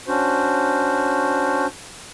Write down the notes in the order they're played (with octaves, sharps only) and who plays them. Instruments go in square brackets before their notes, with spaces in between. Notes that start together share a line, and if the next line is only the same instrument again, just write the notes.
[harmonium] C#4 D4 F#4 C5